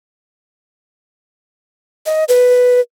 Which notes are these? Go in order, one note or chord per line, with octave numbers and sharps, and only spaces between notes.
D#5
B4